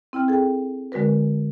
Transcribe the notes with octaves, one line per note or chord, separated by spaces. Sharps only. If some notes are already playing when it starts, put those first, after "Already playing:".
C4 E4 G5 F6
G#4 A4 G5
D3 G#3 F#4 A#4 B4